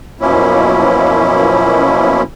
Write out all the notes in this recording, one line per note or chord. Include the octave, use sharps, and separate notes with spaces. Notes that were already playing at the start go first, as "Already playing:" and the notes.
F#2 B2 F3 A#3 C#4 E4